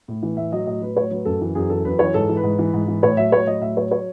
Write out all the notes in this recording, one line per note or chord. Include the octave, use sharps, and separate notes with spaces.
A2
E3
A2 E5
F#3 D#5
A2 D#5
F#3 B4
A2 C#5
F#3 B4
F#2 A4
E3
F#2 G#4
E3 A4
F#2 B4
E3 C#5
G#2 A4
E3
B4
G#2
E3
G#2
E3
A2 C#5
F#3 E5
A2 C#5
F#3 D#5
A2 E5
F#3 C#5
C#5